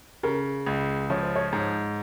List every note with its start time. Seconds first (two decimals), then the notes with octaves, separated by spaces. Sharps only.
0.23 C#3 A#4
0.66 C#2
1.10 F3 C#5
1.23 C5
1.36 C#5
1.53 G#2